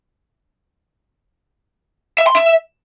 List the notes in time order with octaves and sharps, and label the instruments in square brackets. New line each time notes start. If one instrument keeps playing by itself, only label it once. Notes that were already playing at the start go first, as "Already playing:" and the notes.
[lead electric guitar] E5
C6
E5